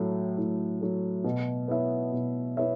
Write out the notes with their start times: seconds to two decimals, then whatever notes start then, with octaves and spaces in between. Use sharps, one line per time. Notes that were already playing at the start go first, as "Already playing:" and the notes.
Already playing: A2 F#3 A3
0.37 A2
0.80 F#3 A3
1.24 B2
1.68 B3 E4 C#5 E5
2.12 B2
2.57 B3 E4 C#5 E5